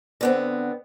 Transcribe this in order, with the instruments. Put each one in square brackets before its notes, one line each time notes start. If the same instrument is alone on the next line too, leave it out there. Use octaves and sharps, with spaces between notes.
[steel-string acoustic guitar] D3 B3 C4